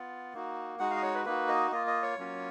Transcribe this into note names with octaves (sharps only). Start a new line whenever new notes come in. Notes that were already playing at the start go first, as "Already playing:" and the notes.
Already playing: B3 F4
A#3 D#4 F#4
G#3 D#4 F#4 F#5
F5
D#5
C#5
B4
A#3 D#4 F#4 B4
D#5
A#3 F4 D#5
D#5
C#5
F#3 A#3 C#4 F4